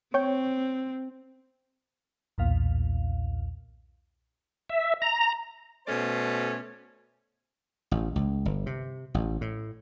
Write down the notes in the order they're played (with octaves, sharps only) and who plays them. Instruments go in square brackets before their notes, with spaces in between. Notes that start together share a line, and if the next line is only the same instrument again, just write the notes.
[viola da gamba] C4 [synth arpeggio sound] C#5 G5
[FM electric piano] B1 E2 A#2 F5
[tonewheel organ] E5
A#5
[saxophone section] B2 A3 C#4 C5 D5
[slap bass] A1
C#2
G1
C3
A1
A2